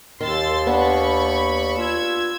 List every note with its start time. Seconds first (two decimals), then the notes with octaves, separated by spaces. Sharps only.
0.21 D#2 D#3 C6 E6 A6
0.66 B3 D4 B5 C#6
1.78 F4 E6 G#6